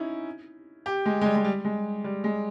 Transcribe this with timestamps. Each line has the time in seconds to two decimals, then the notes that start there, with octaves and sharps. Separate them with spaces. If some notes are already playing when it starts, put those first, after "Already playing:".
Already playing: C#4 D#4 E4
0.86 G4
1.06 G#3
1.21 G#3
1.26 G3
1.36 G#3
1.45 G3
1.65 G#3
2.04 G3
2.24 G#3